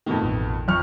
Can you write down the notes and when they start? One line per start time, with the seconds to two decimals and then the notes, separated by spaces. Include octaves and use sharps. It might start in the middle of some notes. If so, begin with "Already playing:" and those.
0.06 F2 B2 D#3 A3 B3
0.22 A1
0.68 F2 C#6 D6 F6 F#6